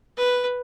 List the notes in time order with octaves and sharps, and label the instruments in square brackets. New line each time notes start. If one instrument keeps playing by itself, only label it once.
[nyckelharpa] B4